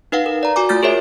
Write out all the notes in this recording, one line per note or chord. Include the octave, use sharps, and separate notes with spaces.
D#4 B4 F5 F#5
A#4
D5 A#5
F#4 G#5 D6
A3 F4 F6 G6 A6
G#4 A#4 C#5 E5